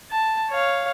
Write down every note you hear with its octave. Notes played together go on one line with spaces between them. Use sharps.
A5
C#5 F5